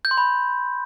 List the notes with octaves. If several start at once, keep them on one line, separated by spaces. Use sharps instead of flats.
G6
C6
B5